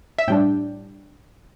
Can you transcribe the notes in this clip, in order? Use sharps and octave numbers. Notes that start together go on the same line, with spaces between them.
E5
A2 G3 D4 G5